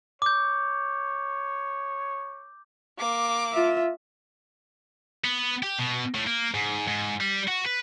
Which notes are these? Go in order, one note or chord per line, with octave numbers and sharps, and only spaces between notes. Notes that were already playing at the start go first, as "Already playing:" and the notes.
C#5 D6 G6
A#3 D6
F4 E5
B3
G4
B2
A2
A#3
G#2
G#2
G3
F#4
B4